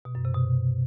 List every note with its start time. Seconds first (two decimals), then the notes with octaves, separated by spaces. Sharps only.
0.05 B2
0.15 F#2
0.25 C3
0.35 B2